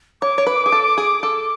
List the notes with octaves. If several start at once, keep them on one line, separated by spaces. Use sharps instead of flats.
C#5 D6
C#5
B4
G#4
A4
G#4
A4